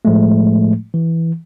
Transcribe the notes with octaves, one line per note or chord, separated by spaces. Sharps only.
A2 F3 G#3 A3
E3